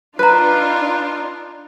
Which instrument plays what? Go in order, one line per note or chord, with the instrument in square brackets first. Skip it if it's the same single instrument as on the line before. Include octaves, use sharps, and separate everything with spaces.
[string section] D4 D#4 F4 [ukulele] B4 [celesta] A#5 F#6